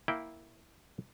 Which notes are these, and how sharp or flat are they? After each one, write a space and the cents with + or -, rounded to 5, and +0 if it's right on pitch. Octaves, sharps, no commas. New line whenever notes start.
A#3 +0 E4 -5 G5 +0